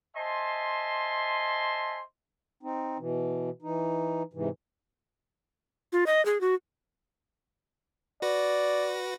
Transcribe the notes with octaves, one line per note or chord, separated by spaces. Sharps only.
C5 D#5 E5 G#5 A5 C6
C4 D#4
B2 E3
E3 D#4
G#2 C3 E3
F4
D#5
G#4
F#4
F#4 B4 D5 A#6